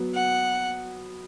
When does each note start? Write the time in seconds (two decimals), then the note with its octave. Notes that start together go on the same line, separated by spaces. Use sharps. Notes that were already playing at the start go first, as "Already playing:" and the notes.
Already playing: F#3 B3
0.12 F#5